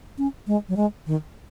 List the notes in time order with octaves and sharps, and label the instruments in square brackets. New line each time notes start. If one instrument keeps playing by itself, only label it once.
[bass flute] C#4
G#3
F#3
G#3
D#3